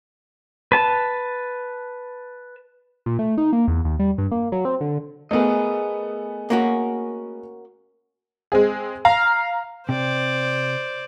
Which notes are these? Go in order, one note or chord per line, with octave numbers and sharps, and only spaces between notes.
B4 A5
A#2
A3
D#4
A#3
E2
D#2
G3
G2
A#3
F#3
C4
D3
A3 B3 G#4 A#4 D#5
A#3 C#4 F#4
G#3 C4 G#4
F5 A#5
C3 C5 D5